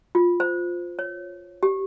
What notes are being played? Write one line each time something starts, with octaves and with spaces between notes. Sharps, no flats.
F4
C5
C#5
G4